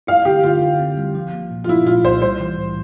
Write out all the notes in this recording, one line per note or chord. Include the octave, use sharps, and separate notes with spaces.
E4 F5
D3 G4
D3 F4
D3
C4
G3
F3
A#3
A#2
F4
F3 E4
A#2 F4
C2 C5
G3 C5
E3
A2